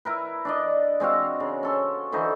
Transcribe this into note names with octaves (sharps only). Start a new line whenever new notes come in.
E4 A#4 B4
D4 D5 D#5
G#3 C4 F#4 F5
C#3
C#4 A4 C6
D3 E3 D#4 C5